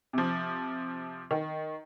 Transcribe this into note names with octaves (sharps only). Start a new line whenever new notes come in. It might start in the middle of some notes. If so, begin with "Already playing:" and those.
C3 F3
D#3